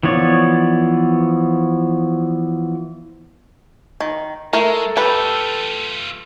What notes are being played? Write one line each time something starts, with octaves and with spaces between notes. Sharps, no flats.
E3 F3 B3 C#5 D5
D#3
G#3 A3 A4 A#4
A3 F4 G4 B4